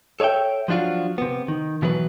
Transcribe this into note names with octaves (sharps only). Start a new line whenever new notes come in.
A4 C#5 D5 E5 G5
F3 F#3 D4 F4 F#4
C3 B3
D#3
B2 E3 F#3 B4